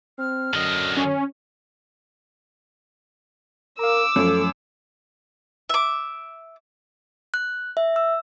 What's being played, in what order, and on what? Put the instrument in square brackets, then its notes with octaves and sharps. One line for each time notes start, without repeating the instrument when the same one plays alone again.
[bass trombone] C4 [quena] F6
[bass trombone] F#2 [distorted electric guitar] D3 D#5
[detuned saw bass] C#4
[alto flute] A#4 [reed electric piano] F5 A#5 [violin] D6 E6
[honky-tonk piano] F#2 [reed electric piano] F3 A3 C#4 [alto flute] A4
[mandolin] E5 D6
[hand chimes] F#6
E5
E6